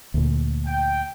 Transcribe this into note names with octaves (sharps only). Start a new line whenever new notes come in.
D2 A#2
G5